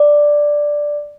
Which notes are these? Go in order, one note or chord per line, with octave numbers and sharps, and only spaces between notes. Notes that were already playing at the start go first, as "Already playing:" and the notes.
Already playing: D5